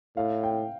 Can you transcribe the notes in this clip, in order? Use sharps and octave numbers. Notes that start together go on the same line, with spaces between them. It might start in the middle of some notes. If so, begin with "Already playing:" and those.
A2 F5
G5